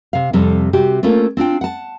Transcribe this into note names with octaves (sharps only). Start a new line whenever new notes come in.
C3 F5
F2 C3 G3 A4
C3 F#4 G4
A3 A#3 C4 C#4 F4
C4 D4 F4 G5
F#5 A5